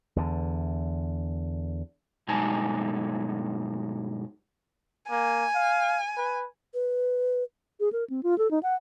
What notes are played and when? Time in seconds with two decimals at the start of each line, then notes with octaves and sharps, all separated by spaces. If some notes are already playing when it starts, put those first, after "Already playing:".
0.16 E2 D3
2.28 G2 B2 G#3 D#4 G#5 A5
5.11 A#3 G#5
5.55 F5
6.17 B4
6.74 B4
7.80 G#4
7.93 A#4
8.10 C4
8.23 F4
8.38 A4
8.51 D#4
8.63 F#5